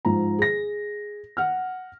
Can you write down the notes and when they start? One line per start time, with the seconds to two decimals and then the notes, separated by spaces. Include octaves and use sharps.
0.05 G#2 F3 A#5
0.38 G#4 A#6
1.37 F#5 F6